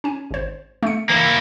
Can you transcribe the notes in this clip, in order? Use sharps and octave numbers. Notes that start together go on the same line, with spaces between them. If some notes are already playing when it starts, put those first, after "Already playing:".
C#4 G#5
G#1 C5
A3 C#7
E3 A#3 E4